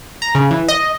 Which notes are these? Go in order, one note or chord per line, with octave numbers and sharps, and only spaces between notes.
A#5
C#3
E3
D#5